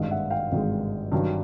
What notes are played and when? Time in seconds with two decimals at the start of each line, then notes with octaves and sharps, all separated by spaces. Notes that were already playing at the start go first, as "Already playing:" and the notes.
Already playing: G#1 G2 D#3 G#3 D#5 F5
0.11 E5 F#5
0.30 F5 G5
0.52 G#1 G2 D#3 G#3
1.12 G2 D#3 F#3